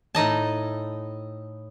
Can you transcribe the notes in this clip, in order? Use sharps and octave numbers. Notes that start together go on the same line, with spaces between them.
A2 D#4 D#5 A5